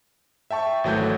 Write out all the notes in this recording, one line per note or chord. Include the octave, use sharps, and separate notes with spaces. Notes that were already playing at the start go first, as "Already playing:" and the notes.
E5 G5 A5 C#6
G#1 E3 F#3 A3 F#4 G6